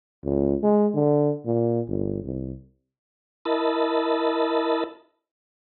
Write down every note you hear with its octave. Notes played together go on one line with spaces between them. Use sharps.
C#2
G#3
D3
A#2
G1
C2
E4 A#4 D#5 A5 B5